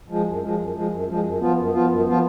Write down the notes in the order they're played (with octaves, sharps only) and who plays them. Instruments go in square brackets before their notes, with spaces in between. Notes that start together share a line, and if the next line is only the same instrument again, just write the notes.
[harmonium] F3 G#3
F#2
F3 G#3
F#2
F3 G#3
F#2
F3 G#3
F#2
F3 B3 F4
F#2
F3 B3 F4
F#2
F3 B3 F4